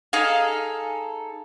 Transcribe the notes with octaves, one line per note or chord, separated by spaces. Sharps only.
D#4 G#4 A4 F5